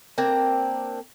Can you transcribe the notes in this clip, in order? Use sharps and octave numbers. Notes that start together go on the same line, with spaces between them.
A#3 C4 D4 A#5